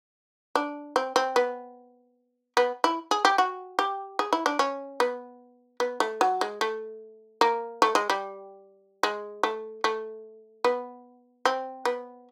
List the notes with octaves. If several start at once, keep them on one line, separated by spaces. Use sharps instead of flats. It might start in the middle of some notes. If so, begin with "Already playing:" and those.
D4
C4
C4
B3
B3
E4
G#4
G4
F#4
G4
G#4
E4
D4
C#4
B3
B3
A3
F#3
G#3
A3
A#3
A3
G#3
G3
G#3
A3
A3
B3
C4
B3